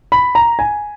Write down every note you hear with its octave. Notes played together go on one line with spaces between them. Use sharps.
B5
A#5
G#5